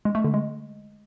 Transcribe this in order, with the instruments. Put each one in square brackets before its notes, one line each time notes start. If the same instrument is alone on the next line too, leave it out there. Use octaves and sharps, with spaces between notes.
[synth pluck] G#3
A3
D3
G#3